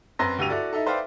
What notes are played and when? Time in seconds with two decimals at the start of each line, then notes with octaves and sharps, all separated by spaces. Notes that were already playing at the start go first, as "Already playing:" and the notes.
0.19 F#2 C4 B4 C6 A#6
0.38 D2 G2 G4 E6 D#7 F7
0.50 E4 F#4 A4 D5
0.73 D#4 E4 A4
0.86 B4 C5 D5 E5 F5 G5